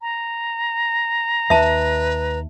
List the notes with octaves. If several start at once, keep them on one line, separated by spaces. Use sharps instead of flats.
A#5
D#2 B4 E5 A5